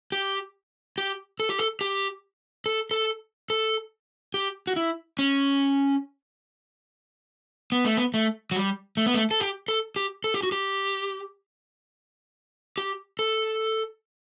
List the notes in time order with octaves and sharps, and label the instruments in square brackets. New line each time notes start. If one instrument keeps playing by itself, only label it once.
[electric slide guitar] G4
G4
A4
G4
A4
G4
A4
A4
A4
G4
F#4
E4
C#4
B3
A3
B3
A3
F#3
G3
A3
B3
A3
A4
G4
A4
G4
A4
G4
F#4
G4
G4
A4